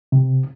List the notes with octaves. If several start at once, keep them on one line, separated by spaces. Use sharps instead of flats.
C3